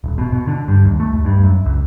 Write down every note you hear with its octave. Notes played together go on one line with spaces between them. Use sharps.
D#1
B2
B2
D3
G2
D#2
A3
D#2
G2
F#2
C#2